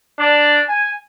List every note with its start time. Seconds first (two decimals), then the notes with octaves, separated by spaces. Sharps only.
0.19 D4
0.68 G#5